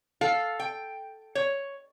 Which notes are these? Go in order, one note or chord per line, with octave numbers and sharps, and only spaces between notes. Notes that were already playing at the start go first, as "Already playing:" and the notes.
A4 F5
G5
C#5